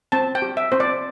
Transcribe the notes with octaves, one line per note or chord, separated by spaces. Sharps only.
C4 A5
G5
G4
E5
C4 C5
D5